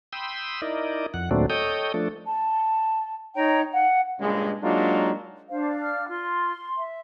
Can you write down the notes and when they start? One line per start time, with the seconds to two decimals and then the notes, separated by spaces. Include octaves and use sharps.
0.13 G5 B5 C6 D#6 E6
0.62 D#4 E4 A#4 D5 D#5
1.14 F2 F#5
1.31 D#2 A#2 F#3 A3 C4 D4
1.50 A4 C#5 D#5 G5 D#6 G6
1.94 F3 A3 D4 A4
2.26 A5
3.35 D#4 C#5 G5 A#5
3.72 F5 F#5
4.20 G2 A#2 C#3 G#3
4.62 F#3 G#3 A#3 D4 D#4 F4
5.50 D4 C5 F5
5.82 F6
6.08 F4 C6
6.77 E5